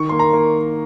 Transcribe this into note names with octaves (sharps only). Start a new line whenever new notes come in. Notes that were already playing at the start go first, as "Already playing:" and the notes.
Already playing: D#3 C#6
A#3 C6
A#5
A#3